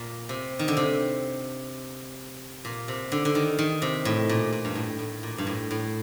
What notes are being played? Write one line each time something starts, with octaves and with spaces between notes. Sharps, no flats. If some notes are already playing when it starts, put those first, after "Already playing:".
Already playing: A#2
C3
D#3
D3
C3
A#2
C3
D3
D3
D#3
D#3
C3
A2
A#2
A#2
G2
A2
A2
A#2
G2
A2
A2